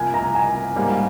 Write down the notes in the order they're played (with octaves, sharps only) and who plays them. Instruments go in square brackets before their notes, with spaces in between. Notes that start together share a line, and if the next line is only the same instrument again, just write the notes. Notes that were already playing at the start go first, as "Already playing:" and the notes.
Already playing: [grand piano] C2 F3 A#3 [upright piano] G#5
[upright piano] A#5
G#5
[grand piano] G#2 G3 A#3